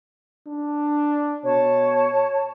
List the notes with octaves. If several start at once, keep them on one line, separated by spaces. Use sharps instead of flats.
D4
B2 C#5 A5